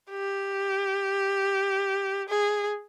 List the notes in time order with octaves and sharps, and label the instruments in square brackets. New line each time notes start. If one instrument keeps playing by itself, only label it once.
[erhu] G4
G#4